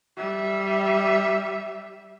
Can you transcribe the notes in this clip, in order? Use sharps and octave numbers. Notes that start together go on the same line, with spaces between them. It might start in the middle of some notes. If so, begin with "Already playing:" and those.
G3 E5